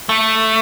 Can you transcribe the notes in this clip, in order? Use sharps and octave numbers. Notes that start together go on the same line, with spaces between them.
A3